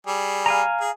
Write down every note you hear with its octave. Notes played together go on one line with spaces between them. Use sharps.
G3 G#4
F5 G#5 A#5
G#4